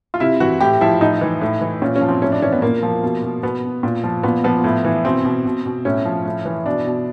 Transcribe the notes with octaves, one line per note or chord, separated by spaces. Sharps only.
F4
C3 E4
E3 F#4
A2 G4
F3 E4
A2 D#4
E3
A2
E3
A#2 C#4
C#4
F3
C4
A2 C#4
D4
E3 C#4
B3
A#2 A#3
F3
B2
B2
B2 B3
B2
A#2
F3
A#2 B3
F3 B3
A2
E3
B2 C4
B2
B2
B2
A2 C#4
F3
A2
E3
B2 D4
B2